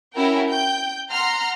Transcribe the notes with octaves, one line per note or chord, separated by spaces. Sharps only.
C#4 E4 F#4 A#4 G5
G5 G6
F#5 A#5 C6 F6